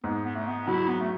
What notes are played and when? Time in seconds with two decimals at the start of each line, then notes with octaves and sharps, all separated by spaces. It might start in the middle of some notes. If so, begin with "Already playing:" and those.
0.04 G#2 B3
0.25 B3
0.36 A3
0.47 B3
0.68 F#3 E4
0.89 B3
1.01 A3